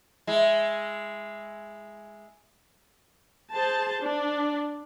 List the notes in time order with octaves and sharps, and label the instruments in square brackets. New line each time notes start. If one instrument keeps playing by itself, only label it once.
[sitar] G#3 E4
[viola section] G#4 C5 A5
D4